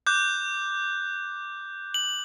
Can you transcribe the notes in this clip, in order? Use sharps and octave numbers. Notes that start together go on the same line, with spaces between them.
D6 F#6 G6
F#7